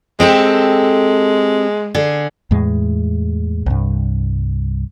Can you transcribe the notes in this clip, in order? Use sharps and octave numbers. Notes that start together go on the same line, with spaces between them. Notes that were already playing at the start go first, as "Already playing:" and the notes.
G#3 C4 G4 A4
D3 G#4
E2 A2 G#3
C2 G2